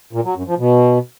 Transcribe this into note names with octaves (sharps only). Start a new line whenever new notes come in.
A#2
F#3
F#2
F3
B2